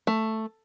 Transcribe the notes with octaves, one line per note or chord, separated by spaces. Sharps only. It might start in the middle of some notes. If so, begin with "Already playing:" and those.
A3